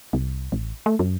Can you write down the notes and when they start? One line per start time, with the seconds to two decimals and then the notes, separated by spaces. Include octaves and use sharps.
0.13 C2
0.52 A1
0.86 A3
0.99 F#2